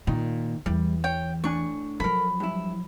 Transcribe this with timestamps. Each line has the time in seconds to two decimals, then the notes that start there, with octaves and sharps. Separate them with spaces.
0.07 A#2 D#3 D#4
0.66 E2 E3 G3
1.04 C#5 G5
1.44 A2 D4 G#5 C#6
2.00 F3 F#3 A4 A#4 B5
2.40 G2 E4